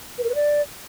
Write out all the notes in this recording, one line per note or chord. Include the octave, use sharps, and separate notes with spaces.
B4
A#4
B4
D5